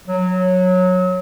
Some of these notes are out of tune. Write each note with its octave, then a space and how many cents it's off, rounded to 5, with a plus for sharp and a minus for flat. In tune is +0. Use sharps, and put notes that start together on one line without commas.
F#3 -15